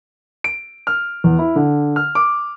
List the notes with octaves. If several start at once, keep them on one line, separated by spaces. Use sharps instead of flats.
D7
F6
E2
E4
D3
F6
D6